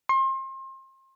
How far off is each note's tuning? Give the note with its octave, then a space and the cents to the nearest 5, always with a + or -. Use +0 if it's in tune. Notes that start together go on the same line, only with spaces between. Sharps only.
C6 +35